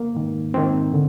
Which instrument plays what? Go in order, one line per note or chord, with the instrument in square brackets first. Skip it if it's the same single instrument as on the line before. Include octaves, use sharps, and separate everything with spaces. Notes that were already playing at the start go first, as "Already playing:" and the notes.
Already playing: [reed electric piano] A#3
G#2 D#3
G#2 D#3 C4
D3